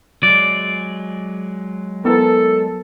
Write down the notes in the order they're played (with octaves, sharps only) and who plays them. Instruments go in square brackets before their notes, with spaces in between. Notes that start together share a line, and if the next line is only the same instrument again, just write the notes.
[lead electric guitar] F#3 G#3 [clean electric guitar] D5
[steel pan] B3 E4 A#4 [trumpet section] A4